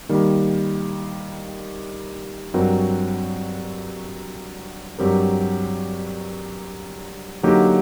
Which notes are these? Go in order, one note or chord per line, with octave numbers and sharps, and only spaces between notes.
D#3 G3 A#3
G2 F#3 C4 F#4 A#4
G2 F#3 C4 G4 A#4
D3 F#3 A#3 D#4 G4